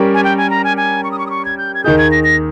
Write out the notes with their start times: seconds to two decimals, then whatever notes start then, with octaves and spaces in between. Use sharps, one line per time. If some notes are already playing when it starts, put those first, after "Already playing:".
Already playing: G3 C#4 G4 A#4
0.14 G#5
0.24 G5
0.38 G#5
0.50 A#5
0.64 G#5
0.77 G#5
1.04 C#6
1.12 D#6
1.19 C#6
1.27 D#6
1.30 C#6
1.45 G#6
1.58 G6
1.74 G#6
1.84 D#2 D#3 A#3 D#4 G#4 G6
1.98 G#6
2.12 A#6
2.24 A#6